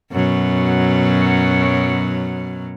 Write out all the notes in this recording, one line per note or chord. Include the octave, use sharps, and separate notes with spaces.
F#2 B2 F#3